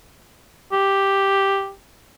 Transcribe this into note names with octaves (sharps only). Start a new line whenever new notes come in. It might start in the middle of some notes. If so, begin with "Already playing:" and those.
G4